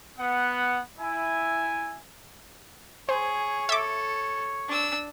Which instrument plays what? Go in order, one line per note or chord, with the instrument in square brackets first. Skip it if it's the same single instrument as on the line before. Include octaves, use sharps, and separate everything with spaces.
[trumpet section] B3 F#5
E4 G#5
[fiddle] G#4 [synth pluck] C5 [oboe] C#5
[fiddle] A4 [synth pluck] E5 D6
[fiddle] D4 E6